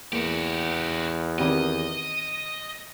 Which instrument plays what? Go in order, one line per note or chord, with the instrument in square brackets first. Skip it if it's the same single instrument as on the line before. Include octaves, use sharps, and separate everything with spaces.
[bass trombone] E2 [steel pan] A#3 [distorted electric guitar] F#4 G4
[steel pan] D#3 C4 G4 [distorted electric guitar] D#5